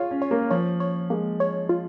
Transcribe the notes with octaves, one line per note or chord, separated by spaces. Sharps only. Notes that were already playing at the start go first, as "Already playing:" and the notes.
Already playing: F4 G#4 C#5
C#4
C#5
A#3
F3 C#5
C#5
G#3 A#3
C#5
F4